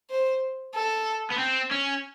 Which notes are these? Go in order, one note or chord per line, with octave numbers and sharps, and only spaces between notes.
C5
A4
B3
C4
C#4